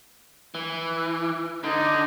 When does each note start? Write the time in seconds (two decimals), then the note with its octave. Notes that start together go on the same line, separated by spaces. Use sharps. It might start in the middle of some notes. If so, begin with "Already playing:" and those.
0.55 E3
1.64 D3 D#4